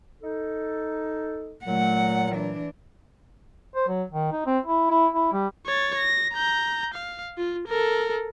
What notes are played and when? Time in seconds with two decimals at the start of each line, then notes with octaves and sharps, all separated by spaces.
0.22 D#4 A4
1.65 A#2 F#3 A3 F#5
2.32 E3 D4
3.75 C5
3.88 F#3
4.11 D#3
4.32 D#4
4.46 C4
4.66 E4
4.90 E4
5.14 E4
5.33 G3
5.66 C#5 A6
5.97 A#6
6.34 A#5 G6
6.94 F5
7.38 F4
7.67 A4 A#4